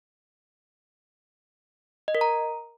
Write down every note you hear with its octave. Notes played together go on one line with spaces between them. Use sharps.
D#5
A#4
A#5